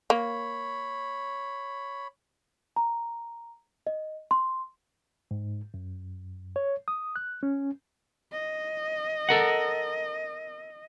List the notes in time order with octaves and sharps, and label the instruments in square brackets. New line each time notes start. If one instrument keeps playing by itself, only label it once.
[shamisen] A#3 [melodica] C#5 B5
[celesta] A#5
D#5
C6
[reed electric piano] G#2
F#2
C#5
D#6
F#6
C#4
[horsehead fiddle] D#5
[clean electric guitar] A4 A#4 F#5